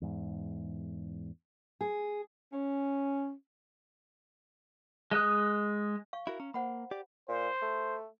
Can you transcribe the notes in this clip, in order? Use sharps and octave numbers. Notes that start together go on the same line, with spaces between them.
E2 G#2
G#4
C#4
G#3 D#5 D#6 F#6
F5 C#6
E4 F#4 A#4
C#4 A#5
A#3 C5 F#5 B5
G4 D5
A#2 C5
A3